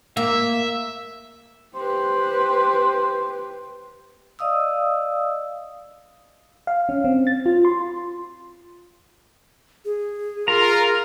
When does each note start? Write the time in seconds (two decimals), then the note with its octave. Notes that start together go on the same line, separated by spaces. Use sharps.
0.17 A#3 E5
1.75 G4 B4 C5
4.39 D5 D#5 F5 D#6 E6
6.67 F5
6.89 C#4
7.04 C4
7.27 A6
7.46 F4
7.65 C6
9.85 G#4
10.48 F4 A#4 A#5